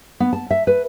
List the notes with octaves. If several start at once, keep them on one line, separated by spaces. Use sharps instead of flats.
B3
A5
E5
B4